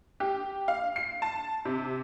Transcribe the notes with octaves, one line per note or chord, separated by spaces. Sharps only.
G4
F5
C7
A5
C3